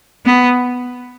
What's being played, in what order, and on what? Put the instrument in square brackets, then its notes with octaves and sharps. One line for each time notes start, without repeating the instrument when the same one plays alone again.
[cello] B3